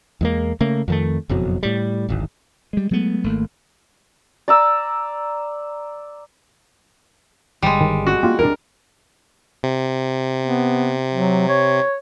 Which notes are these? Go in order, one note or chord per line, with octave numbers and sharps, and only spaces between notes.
E2 G#3 A#3
C#3 A3 A#3
F2 D#3 A3
F#1 F2 B2 F#3
A2 G3
D1 G#1
G3 G#3
F#3 G#3 A3 B3
G#1 A3 A#3
D5 A#5 E6
G1 G3 G#3
D#3
F#4
A#3 C4 F4 G4
D2 D4 A#4
C3
B3
F#3
C#5